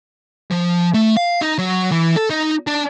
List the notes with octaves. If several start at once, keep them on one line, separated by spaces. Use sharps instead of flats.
F3
A3
F5
D#4
F#3
E3
A4
D#4
D4